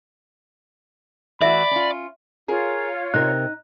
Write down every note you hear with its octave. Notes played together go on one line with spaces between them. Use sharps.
E3 A3 F#4 D5 E5 B5
C#4 F4
F4 G#4 A#4 C#5
C3 C4 D#4 A#4 F#6